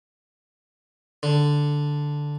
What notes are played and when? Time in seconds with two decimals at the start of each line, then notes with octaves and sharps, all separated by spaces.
1.23 D3